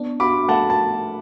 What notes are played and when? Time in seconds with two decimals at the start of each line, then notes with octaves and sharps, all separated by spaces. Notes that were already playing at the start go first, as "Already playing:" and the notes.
Already playing: B3 D4
0.20 F#4 B5 D6
0.48 A3 F#5 A5
0.70 A5